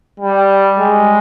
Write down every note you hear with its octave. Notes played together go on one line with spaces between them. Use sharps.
G3
G#3